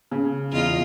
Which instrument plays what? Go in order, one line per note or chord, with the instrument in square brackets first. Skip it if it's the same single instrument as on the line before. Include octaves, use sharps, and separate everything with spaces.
[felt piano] C#3
[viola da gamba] E2 F4 D#5